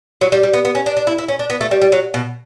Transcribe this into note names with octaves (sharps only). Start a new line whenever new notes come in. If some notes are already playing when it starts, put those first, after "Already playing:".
F#3
G3
G3
B3
B3
C#4
D4
D4
E4
E4
C#4
D4
B3
A3
G3
G3
F#3
B2